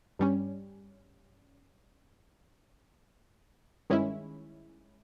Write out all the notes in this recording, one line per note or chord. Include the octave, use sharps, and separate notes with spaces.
G2 G3 C#4
G2 D#3 G#3 C#4 E4